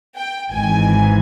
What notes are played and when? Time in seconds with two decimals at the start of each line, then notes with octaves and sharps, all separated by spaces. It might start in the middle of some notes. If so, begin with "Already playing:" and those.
0.17 G5
0.53 G#1 G#2 E3 G#5